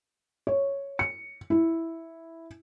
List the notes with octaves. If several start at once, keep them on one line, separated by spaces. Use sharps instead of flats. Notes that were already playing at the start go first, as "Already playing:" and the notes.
C#5
C#7
E4